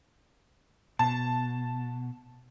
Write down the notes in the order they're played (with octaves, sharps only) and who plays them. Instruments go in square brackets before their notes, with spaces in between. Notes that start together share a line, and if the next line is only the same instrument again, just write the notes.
[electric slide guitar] B2 [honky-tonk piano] A5